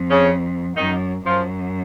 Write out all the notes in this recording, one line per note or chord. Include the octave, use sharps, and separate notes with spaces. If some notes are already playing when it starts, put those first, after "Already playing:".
Already playing: F2
C#3 C#4
F#2 D#3 D#4
F#2 F3 F4